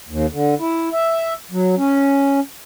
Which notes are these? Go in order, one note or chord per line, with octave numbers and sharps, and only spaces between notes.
D#2
D3
E4
E5
F#3
C#4